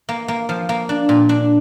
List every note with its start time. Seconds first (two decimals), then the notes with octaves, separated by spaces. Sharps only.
0.09 A#3
0.28 A#3
0.49 F3
0.69 A#3
0.89 D4
1.09 A#2
1.29 D4